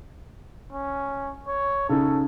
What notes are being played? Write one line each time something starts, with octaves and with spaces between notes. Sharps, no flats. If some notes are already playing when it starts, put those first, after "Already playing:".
C#4
C#5
C#3 D#4 G#4 A4